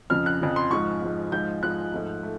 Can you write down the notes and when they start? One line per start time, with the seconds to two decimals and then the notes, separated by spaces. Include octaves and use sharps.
0.10 F2 C#3 F3 F6
0.26 F#6
0.41 F2 C#3 F3
0.56 C6
0.71 G#2 F3 G#3 C#6
1.02 G#2 F3 G#3
1.32 G#2 F3 G#3 G6
1.62 G#2 F3 G#3 F#6
1.93 G#2 F3 A3
2.23 A3